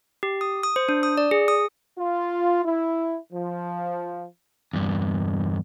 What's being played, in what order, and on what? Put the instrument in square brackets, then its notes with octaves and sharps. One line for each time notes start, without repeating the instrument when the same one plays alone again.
[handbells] G4
D#6
D#6
C5
D4
D#6
D5
G#4
D#6
[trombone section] F4
E4
F3
[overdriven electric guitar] E2 G2